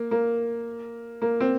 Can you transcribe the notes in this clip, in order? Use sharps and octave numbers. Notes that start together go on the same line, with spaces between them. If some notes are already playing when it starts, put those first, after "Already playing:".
Already playing: A#3
A#3
A#3
C4